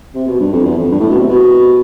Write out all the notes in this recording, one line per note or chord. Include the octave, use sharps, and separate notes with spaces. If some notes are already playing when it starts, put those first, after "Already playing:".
C3
B2
G2
F2
E2
F2
G2
A2
B2
C3
B2